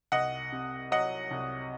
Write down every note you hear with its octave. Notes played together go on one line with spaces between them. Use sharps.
C2 D#5 F#5
C3
F#3 D#5 F#5
C2